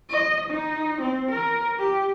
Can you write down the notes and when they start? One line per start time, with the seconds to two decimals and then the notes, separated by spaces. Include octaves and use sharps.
0.10 D#5
0.50 D#4
1.02 C4
1.31 A#4
1.79 G4